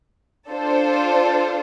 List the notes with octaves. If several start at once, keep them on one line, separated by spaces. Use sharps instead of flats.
D4 F4 A4 C5